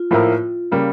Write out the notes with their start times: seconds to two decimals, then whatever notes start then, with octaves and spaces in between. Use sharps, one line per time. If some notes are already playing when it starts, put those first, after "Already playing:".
Already playing: F4
0.11 A2 F3 A#3 E4 A#4
0.71 C#3 G3 A#3